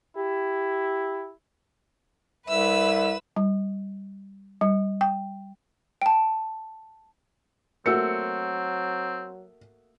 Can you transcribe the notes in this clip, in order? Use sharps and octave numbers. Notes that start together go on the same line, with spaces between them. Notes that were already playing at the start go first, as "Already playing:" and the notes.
E4 G4
C2 B4 E5 E6
G3
G3
G5
G5 A5
F#3 A3 A#3 C4 F#4 E6 C#7